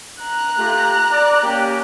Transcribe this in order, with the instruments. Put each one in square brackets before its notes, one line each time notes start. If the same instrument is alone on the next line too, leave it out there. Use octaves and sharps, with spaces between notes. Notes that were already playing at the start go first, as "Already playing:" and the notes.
[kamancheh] A#5 F#6
[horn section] A3 F4 G4
D5
A#3 C#4 G4